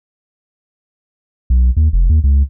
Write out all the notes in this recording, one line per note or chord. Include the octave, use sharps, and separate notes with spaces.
B1
D#2
F1
D#2
C#2